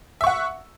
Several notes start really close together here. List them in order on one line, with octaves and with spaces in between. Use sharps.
E5 C#6 F#5